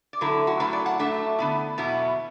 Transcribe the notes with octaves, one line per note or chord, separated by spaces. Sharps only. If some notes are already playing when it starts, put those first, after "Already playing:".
D5
D3 F#3 A3 E4 B4
F#4
F#2 F#3 A3 E4 B4
D5
F#5
A2 F#3 A3 D4 E5
D3 B3 E4
E2 B2 F#3 B3 E4